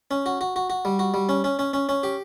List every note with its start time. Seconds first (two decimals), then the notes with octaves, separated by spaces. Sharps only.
0.11 C#4
0.26 F#4
0.41 F#4
0.56 F#4
0.70 F#4
0.85 G3
0.99 F#4
1.14 G3
1.29 C#4
1.44 C#4
1.59 C#4
1.74 C#4
1.89 C#4
2.03 G4